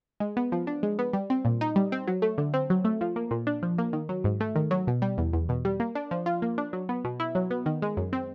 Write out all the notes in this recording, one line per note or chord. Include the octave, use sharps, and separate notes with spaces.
G#3
B3
F3
D4
G#3
B3
G3
C4
A#2
D#4
G3
C4
F#3
A3
D3
C4
F#3
A3
F3
A#3
A#2
D4
F3
A#3
D#3
F#3
G#2
A3
D#3
F#3
B2
G3
E2
E2
B2
G3
A#3
D4
F3
F4
A#3
D4
F#3
B3
B2
E4
F#3
B3
D#3
G#3
F#2
C4